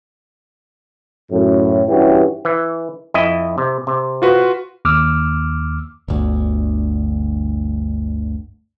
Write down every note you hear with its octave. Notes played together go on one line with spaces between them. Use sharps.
F#2 A2
G2 E3 C#4 E4 F#4 G4
E3
F2 E4 D#5
C3
C3
F4 F#4 B4
D#2 D6 E6 F6
G1 D2